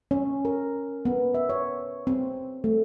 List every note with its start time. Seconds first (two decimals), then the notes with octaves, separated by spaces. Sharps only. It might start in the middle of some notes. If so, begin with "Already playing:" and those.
0.11 C#4
0.45 A#4
1.05 B3
1.34 E5
1.49 C#5
2.07 C4
2.64 A3